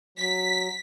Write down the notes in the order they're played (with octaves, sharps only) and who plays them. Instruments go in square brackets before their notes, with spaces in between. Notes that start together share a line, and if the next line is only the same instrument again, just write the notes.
[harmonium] F#3 [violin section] B6